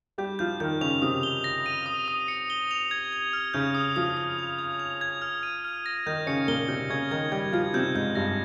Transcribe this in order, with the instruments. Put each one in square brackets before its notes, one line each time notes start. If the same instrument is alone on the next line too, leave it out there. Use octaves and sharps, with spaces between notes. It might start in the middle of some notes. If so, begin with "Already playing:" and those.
[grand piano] G3 G4 [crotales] G6
[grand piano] F3 F4 [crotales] G6
[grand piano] D#3 D#4 [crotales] G6
[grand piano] C#3 C#4 [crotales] F7
[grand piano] C3 C4 [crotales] D#6
[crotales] G7
A#6
D#7
D#6
D#6
C#7
G7
F7
G#6
G#6
F6
[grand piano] C#3 C#4 [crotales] G6
[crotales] D#6
[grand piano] F3 F4 [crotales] D#6
[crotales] D#6
F7
G#6
F7
G#6
F6
D#7
F6
A#6
[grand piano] D#3 D#4 [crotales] G6
[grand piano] C#3 C#4 [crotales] C#7
[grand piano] A#2 A#3 [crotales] G7
[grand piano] C3 C4 [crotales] G6
[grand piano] C#3 C#4 [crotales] G#6
[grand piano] D#3 D#4 [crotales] G#6
[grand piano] G3 G4 [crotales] G#6
[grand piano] F3 F4 [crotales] G#6
[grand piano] C3 C4 [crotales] G6
[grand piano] G#2 G#3 [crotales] G6
[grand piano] G2 G3 [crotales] A#6